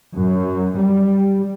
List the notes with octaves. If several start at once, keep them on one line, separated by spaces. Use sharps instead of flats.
F#2
G3